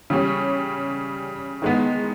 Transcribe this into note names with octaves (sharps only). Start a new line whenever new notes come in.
C#3 G3 C#4
D#3 G#3 B3